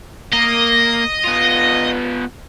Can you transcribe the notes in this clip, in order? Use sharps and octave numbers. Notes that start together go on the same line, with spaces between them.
A#3 D#5
B3 F4